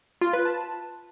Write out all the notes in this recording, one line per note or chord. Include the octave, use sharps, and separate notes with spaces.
F4
B4
A5